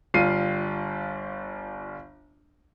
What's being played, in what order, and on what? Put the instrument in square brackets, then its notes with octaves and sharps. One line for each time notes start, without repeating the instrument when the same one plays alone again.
[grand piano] G1 G3 F4 C7 D#7